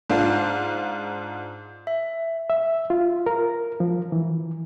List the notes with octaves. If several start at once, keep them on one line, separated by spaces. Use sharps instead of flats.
G#2 D4 F4
E5
E5
F4
A#4
F3
E3